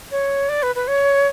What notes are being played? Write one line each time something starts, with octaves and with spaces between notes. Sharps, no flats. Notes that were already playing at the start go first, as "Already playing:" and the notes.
C#5
D5
B4
B4
C#5